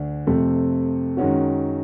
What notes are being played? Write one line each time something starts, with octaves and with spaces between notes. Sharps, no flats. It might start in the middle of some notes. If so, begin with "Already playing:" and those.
Already playing: D2 D4
F2 C3 F3 A3 C4
F#2 D#3 G#3 C#4 F#4